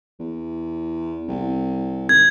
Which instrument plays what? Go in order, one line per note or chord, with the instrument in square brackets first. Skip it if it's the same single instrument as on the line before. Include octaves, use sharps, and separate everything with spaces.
[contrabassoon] E2
C2
[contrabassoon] G#1 [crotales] G#6